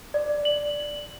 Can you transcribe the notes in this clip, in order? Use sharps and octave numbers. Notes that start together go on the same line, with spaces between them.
D5
F#7